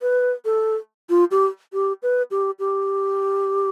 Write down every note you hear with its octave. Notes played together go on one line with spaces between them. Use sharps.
B4
A4
F4
G4
G4
B4
G4
G4